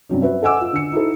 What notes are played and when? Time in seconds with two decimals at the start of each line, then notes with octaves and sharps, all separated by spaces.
0.09 G2 C3 F#3 C#4
0.22 F#4 B4 E5
0.43 A4 D#5 F#5 G#5 D6 E6
0.61 F4
0.73 D3 C#7
0.92 D#4 E4 F#4 A4